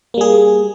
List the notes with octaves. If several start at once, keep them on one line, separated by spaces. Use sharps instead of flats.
G3 A#3 G#4